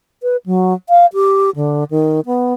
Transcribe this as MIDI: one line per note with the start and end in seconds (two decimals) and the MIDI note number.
0.23 0.37 71
0.46 0.74 54
0.89 1.06 77
1.14 1.50 67
1.56 1.84 50
1.91 2.20 51
2.26 2.54 59